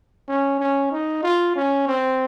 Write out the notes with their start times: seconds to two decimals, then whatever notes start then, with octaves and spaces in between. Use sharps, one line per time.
0.28 C#4
0.59 C#4
0.91 D#4
1.23 F4
1.55 C#4
1.87 C4